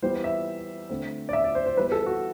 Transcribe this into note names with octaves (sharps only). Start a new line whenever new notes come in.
E3 G3 B3 C5
E5
D3 A3 C4
D5
E5
D5
C5
C5
E3 G3 B3 B4
A4
F#4